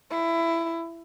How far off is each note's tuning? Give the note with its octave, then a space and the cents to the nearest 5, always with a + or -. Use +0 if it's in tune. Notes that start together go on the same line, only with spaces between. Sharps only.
E4 +15